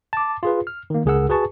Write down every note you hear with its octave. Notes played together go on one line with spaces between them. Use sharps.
A5 D6
F4 G#4 B4
F6
D#3 A#3
C#2 C#3 G#4 A#4 F#5 E6
F#4 G#4 B4 G#5 A5 C#6